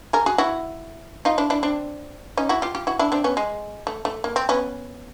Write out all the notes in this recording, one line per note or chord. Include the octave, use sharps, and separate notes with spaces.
G#4 A#4
F#4 G#4
E4 F#4
D#4 F4
D4 E4
D4 E4
C4 D4
C#4 D#4
E4 F#4
F4 G4
F4 G4
E4 F#4
D4 E4
C4 D4
B3 C#4
G#3
A3
A3
A#3
C4
B3 C#4